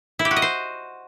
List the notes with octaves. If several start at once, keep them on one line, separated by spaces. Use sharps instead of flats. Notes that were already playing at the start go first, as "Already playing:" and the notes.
E4
G4
F#4
D#5
C5